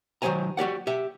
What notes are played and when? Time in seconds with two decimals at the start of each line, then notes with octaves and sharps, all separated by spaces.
0.22 D#3 F#3 C#4 C5 G#5 A#5
0.57 F#4 G4 D5 F#5
0.87 G4 E5